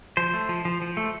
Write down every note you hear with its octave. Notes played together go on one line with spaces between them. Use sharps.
F3 C5
A3
F3
F3
F3
A3